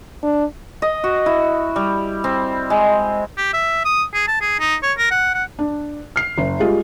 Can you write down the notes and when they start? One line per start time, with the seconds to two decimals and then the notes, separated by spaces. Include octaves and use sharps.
0.23 D4
0.82 D#5
1.04 F#4
1.26 E4
1.76 G3
2.24 C4
2.70 G#3
3.38 G4
3.53 E5
3.85 D#6
4.14 G#4
4.28 A5
4.41 G#4
4.60 D#4
4.83 C#5
4.98 A#4
5.11 F#5
5.34 F#5
5.59 D4
6.16 F6 C7
6.38 F#1
6.60 G3 G#3 F4